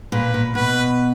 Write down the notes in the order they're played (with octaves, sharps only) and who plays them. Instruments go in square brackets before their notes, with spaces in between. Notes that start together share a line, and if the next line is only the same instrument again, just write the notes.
[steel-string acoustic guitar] A#2 [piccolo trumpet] B4
[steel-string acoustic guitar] A#2
[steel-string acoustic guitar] B2 [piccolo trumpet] B4